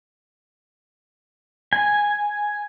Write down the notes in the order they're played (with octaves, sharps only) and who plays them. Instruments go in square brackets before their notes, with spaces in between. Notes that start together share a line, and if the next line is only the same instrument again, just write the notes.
[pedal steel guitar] G#5